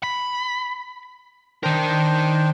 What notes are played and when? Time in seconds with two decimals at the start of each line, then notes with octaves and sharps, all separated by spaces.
0.03 B5
1.63 D#3 D4 A#4 C5 G5